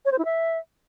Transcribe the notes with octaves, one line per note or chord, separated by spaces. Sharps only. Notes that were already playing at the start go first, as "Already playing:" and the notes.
C#5
C5
E4
E5